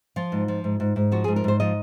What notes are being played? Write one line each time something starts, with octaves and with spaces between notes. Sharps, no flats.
F3 F4
G#2
F3
G#2
G#2
G#2
F3 F#4
G#2 G#4
A#4
G#2 C5
F3 D#5